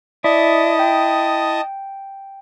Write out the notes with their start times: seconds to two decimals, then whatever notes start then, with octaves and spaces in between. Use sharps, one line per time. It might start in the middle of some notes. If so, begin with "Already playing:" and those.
0.24 E4 D5 D#5 A5 D#6
0.79 G5